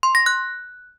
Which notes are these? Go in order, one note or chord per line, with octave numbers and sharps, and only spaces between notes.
C6
A#6
F#6